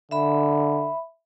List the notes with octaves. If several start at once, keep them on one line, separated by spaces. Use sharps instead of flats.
D3 E5 B5